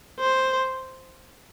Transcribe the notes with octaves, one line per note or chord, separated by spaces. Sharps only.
C5